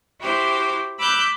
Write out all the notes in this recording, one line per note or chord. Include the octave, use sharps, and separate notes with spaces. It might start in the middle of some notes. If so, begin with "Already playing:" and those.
E4 F#4 G4 C5
B5 D6 E6 F#6 G6